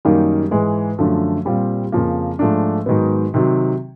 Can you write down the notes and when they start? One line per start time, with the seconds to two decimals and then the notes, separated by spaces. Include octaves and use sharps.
0.05 F#2 D#3 G3 A#3 D#4
0.51 G#2 E3 G#3
0.98 F#2 D3 F3 A3
1.45 A#2 G3 C4 F4
1.92 F2 C#3 F3 A#3
2.39 G#2 F3 A3 D4
2.86 G#2 D#3 F#3 B3
3.34 C3 D#3 F#3